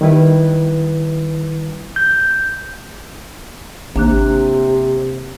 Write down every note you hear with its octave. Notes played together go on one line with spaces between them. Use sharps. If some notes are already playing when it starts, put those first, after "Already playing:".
D#3 G3 E4 B4
G6
G#1 C3 A#3 D4 F#6